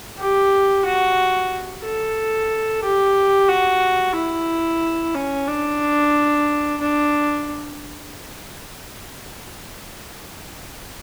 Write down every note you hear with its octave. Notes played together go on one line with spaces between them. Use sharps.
G4
F#4
A4
G4
F#4
E4
C#4
D4
D4